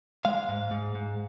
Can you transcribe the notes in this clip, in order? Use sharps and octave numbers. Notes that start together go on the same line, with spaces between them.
G#3 F5
G#2
G#2
G#2